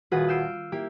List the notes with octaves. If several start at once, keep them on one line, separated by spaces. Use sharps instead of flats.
D#1 F4 F#4 G#4 B4 F#5
E6 F6 G6 C7 D7 D#7
A#3 E4 G4